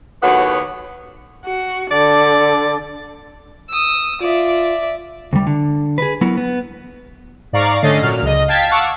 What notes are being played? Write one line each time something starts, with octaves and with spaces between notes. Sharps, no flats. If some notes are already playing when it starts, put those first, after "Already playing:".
D#2 A2 F#3 B3 F#4 F#5
F#4
D3 D5
D#6 E6
F4 D5 E5
D2 G3
D3
G#4 B4
F#3 B3 E4 A#4
B3
G#2 D5 F5 A#5 C#6
D3 A3 C#4 D#5 A6 C7
A#2 F#3 F6
C#2 D#5
F5 G5 A5 G#6 A6 B6
F5 F#5 A5 C#6 D6 E6